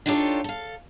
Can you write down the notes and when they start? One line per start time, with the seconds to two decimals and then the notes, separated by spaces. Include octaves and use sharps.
0.06 D4 D#4 F4 G4 A4 C#5
0.44 A4 F5